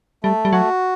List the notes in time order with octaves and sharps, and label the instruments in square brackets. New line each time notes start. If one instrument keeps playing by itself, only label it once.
[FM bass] G3 [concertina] A3
[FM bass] G3
[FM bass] F#3 [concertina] F#4